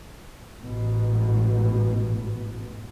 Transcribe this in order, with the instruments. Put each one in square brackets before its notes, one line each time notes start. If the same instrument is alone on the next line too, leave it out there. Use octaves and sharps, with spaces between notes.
[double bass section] A1 G#2 B2